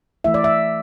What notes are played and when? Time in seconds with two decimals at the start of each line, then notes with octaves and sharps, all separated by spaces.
0.24 E3 A3 E4 E5
0.34 D5
0.44 E5